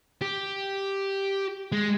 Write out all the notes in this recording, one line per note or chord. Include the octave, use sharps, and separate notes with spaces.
G4
G#3